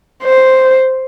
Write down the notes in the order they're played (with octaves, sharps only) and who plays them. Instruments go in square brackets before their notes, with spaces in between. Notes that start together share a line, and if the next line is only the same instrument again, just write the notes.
[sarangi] C5